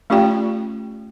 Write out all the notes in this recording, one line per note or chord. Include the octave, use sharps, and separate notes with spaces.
A3 C#4 F4 G4 D5 G5